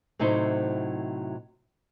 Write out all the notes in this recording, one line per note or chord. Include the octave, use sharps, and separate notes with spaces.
A2 C3 F#3 D#4 E4 C5